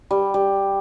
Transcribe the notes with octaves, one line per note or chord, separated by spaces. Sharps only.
G3
G3